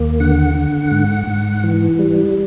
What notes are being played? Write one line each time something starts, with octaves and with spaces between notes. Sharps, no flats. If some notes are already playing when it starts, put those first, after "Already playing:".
Already playing: D#2 A#3
D3 F#5
D3
G#2
G#2
E3
G3